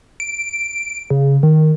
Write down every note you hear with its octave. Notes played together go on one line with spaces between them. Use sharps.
D7
C#3
D#3